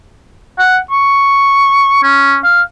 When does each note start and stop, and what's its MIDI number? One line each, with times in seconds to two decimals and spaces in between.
0.59 0.78 78
0.91 2.00 85
2.03 2.38 61
2.44 2.62 77